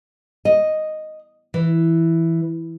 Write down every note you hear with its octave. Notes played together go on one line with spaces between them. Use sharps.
D#5
E3